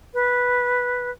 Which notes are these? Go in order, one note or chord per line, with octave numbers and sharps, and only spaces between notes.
B4